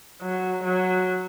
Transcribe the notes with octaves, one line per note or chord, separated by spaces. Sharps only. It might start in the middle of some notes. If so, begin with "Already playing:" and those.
F#3
F#3